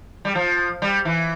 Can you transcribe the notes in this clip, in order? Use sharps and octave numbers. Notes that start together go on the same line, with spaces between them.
G3
F3
G3
E3